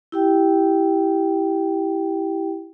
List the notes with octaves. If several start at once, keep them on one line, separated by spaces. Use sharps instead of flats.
E4 G4 G5